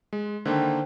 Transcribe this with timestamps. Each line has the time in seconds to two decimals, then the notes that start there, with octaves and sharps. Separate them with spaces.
0.13 G#3
0.46 D3 D#3 A#3 C5 G5